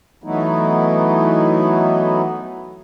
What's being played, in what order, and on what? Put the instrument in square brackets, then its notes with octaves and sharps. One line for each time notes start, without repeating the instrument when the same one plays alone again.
[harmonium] E3 F#3 A3 B3 D#4 E4